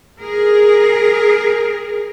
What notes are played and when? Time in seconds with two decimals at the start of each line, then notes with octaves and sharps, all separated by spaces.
0.21 G#4 A#4